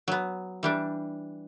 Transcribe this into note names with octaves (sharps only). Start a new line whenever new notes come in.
F#3 B3
E3 G3 D4